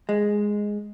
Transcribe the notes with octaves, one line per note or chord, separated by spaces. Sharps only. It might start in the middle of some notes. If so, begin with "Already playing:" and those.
G#3